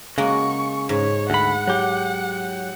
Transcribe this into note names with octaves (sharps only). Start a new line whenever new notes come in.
C#3 G#3 A#3 F#4 C#6
G#2 C#5
D2 F#5 B5
F#3 G4